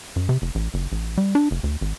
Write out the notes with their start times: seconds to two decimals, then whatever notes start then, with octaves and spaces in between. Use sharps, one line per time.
0.16 F#2
0.29 C3
0.42 F1
0.55 A1
0.74 F#1
0.92 A1
1.18 G3
1.35 D4
1.51 F1
1.64 D2
1.81 G#1